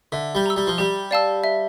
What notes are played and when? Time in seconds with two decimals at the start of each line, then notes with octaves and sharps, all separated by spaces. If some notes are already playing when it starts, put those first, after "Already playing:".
0.12 D3 E5
0.35 G3
0.46 A#5 E6
0.56 G3
0.67 F3
0.78 G3 G4
1.11 D5 F5 A5 E6
1.44 E5